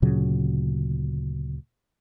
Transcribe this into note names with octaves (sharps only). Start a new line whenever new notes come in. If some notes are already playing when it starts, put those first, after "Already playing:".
D2 A#2 C#3 F#3